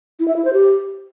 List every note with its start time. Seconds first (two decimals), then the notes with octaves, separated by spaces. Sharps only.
0.20 E4
0.28 E5
0.36 E4
0.45 C5
0.53 G4